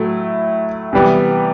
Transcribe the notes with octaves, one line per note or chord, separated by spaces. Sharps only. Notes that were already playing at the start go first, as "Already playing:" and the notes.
Already playing: A2 F#3 A3 E4
C3 E3 G3 B3